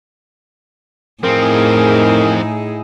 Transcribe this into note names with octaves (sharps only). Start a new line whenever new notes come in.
A2 F3 C4 D#4 E4 G#4 A#4